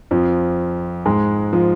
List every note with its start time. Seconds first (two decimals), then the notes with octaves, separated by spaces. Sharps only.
0.11 F2 F3
1.06 G#2 G#3
1.53 F3